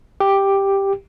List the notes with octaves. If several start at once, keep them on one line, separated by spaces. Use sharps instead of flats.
G4